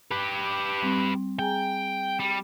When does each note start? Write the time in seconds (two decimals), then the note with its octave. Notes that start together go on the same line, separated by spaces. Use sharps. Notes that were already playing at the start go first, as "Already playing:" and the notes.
0.11 G4 B4
0.82 G3 C4
1.39 G#4 G5 G#5 A#5
2.19 G3